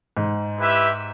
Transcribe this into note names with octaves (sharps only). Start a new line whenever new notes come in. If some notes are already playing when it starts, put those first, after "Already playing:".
G#2
E4 G4 B4 E5